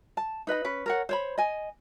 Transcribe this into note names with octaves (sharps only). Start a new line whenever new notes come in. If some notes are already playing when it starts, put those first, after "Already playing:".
A5
D#4 B4 D#5 B5
C#4 B4
A#4 C#5 F#5
C5 C#5 B5
D#5 G#5